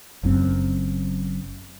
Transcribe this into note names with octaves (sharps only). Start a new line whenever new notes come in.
F#1 F#2 C4